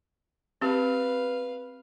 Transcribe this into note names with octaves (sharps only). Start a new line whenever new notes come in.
C4 G4 B4 F5